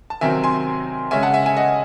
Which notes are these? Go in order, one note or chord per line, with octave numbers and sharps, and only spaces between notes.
A5
C3 D#3 F#3 C4 E5 G#5
G#5 C6
C#3 G#3 C#4 E5 G#5
F#5 A5
E5 G#5
E5 G#5
D#5 F#5